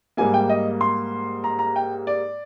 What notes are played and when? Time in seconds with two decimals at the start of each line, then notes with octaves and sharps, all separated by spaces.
0.17 G#2 G3 A#3 G#5
0.34 G5
0.49 D#5
0.81 C6
1.44 A#5
1.59 A#5
1.76 G5
2.07 D5